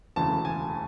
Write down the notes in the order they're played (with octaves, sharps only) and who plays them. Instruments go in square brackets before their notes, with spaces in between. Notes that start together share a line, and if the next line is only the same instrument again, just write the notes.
[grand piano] E1 D2 C#3 E3 A5
G#5